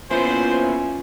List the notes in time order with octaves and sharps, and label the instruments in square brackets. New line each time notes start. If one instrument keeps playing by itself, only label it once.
[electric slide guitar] A#3 B3 E4 [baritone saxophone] C#4 [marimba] F4 [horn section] C5